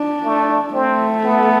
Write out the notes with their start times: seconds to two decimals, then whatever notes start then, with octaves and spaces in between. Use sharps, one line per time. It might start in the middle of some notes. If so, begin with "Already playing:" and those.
Already playing: D4
0.24 A3
0.74 A3 C4
1.24 B3